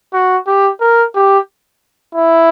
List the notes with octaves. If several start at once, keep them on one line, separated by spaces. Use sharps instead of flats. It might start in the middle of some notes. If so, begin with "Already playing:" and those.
F#4
G4
A#4
G4
E4